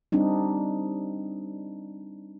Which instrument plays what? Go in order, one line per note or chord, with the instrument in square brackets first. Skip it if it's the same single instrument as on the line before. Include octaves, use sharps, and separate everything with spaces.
[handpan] G3 C4 D4 D#4